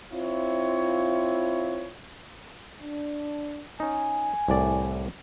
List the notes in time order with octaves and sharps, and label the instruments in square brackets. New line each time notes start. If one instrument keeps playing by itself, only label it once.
[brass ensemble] C4 E4 F4 C#5
D4
[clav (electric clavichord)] C#4 D#4 [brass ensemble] G#5
[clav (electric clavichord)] C2 A2 D5